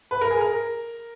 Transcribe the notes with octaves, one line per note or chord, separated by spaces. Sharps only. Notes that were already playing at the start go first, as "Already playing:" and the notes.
B4
A#4
G#4
A#4